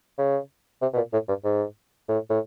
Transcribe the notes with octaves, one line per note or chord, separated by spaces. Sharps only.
C#3
C3
B2
A#2
A2
G2
G#2
A2
A2